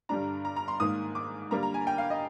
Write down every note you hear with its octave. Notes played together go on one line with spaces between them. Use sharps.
G2 D3 G3 D4 A#5
A#5
A#5
C6
G#2 D#3 A#3 D#6
D6
D3 G3 A#3 A#5
A#5
G#5
G5
F5
D#5